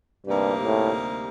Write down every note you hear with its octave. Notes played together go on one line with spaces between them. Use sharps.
D2 G2 C3 G3 A#3 D#4
A2